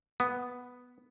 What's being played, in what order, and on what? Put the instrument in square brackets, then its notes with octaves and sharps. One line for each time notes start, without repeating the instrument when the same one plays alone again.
[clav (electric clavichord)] B3